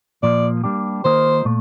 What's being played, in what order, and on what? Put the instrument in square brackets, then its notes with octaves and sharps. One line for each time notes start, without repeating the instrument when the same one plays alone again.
[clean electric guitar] A#2 F3 A#3 [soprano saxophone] D5
[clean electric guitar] G3 A#3 D4 G4
[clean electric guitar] D#3 A#3 F4 A#4 D#5 [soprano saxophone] C5
[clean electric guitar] A#2 A3